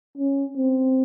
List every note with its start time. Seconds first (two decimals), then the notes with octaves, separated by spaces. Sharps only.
0.18 C#4
0.57 C4